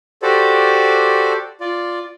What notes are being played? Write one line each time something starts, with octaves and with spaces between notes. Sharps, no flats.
F#4 G4 A4 C5 D5
F4 D5